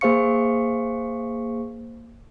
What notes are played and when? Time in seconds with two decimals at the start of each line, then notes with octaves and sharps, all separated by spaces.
0.01 A#3 G#4 C5 F5 C#6 C#7